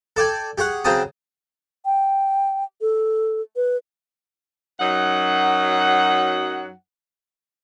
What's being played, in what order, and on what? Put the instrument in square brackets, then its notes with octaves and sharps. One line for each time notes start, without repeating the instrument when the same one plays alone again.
[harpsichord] A4 D5 G5 G#5
G4 G#4 C#5 F#5
C#3 F#3 C4 G5 A5 D#6
[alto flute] G5
A4
B4
[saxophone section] F#2 F#3 D#4 F#5